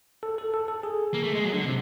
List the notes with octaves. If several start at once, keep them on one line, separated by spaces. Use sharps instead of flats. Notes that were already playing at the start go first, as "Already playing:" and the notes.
A4
A4
A4
A4
G#4
A#3
A3
G#3
F#3
D3
C3